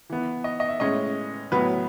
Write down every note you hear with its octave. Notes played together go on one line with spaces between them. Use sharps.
E3 B3
D#5
D#5
E5
A2 G#3 C#4 D#5
A2 F#3 B3 B4